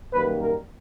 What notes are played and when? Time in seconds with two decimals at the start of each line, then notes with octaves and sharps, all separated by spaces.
0.13 F#2 D#3 G3 A#3 B4
0.41 A#4